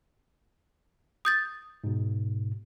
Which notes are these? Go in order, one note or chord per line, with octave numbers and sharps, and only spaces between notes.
D#6 G6 A6
G#2 B2